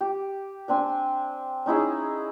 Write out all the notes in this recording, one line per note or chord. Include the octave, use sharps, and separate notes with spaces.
G4
C4 D4 G#5
C#4 D#4 E4 G#4